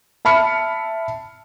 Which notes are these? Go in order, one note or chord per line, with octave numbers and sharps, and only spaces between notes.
E5 A5 B5 F6 C#7